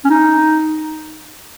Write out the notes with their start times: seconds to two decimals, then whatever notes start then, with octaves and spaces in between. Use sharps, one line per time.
0.05 C#4
0.10 D#4